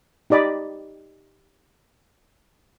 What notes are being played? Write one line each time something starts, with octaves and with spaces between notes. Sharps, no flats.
D#4 G4 D5 D#5 B5